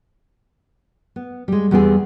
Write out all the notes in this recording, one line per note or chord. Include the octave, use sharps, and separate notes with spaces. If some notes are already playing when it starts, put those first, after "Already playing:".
B3
G3 G#3
E2 G3 B3 C4 G#4